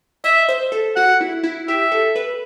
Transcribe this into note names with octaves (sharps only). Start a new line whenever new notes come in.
D#5 E5
C5
A4
F#4 F#5
E4
E4
G4 E5
A4
B4